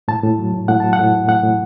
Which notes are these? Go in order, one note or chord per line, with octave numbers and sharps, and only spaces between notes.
A2 A5
A2
F#3
A2
A2 F#5
F#3 A5
F#5
A2
A2
A2 F#5
A2